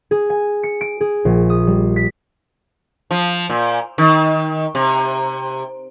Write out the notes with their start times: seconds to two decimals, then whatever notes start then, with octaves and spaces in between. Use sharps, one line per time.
0.11 G#4
0.30 G#5
0.63 C#7
0.81 D7
1.01 G#4
1.25 A#1
1.49 D#6
1.67 G3
1.96 B6
3.11 F3
3.50 A#2
3.98 D#3
4.75 C3